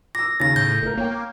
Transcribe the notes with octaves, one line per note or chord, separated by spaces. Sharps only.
D6 E6 A#6
D#2 C#3 A6 A#6
A2 G6
G1 A3 A#4
A#3 C#5 G5